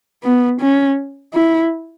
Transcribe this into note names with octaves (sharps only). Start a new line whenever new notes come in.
B3
C#4
E4